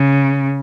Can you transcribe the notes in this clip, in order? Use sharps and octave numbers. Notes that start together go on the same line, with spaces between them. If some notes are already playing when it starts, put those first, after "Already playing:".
Already playing: C#3